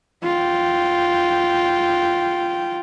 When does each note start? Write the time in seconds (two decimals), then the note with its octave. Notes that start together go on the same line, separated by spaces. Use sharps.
0.24 F4 G5